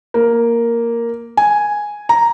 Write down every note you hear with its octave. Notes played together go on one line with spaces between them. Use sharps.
A#3
G#5
A#5